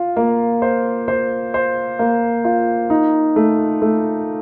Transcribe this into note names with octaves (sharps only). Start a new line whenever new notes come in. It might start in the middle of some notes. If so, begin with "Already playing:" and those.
Already playing: F4
A#3
C5
C5
C5
A#3
F4
D#4
A3
A3